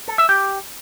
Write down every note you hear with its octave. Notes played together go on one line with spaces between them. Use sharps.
A4
E5
G4